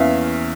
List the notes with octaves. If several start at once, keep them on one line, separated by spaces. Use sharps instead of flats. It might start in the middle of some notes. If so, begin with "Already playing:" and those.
Already playing: E2 E3 A#3 C#4 E5 F5